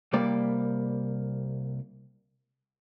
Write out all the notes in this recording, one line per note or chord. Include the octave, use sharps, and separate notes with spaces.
C2 G3 A#3 D5